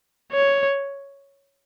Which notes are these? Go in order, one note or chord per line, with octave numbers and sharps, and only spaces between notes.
C#5